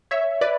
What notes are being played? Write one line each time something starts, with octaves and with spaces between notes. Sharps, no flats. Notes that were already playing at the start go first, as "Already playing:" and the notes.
C#5 E5
B4 D5